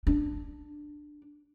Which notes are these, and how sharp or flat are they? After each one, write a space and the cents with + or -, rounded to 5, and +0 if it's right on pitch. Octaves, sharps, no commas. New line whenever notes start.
D4 +10